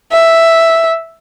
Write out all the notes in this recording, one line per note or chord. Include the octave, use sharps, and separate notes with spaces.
E5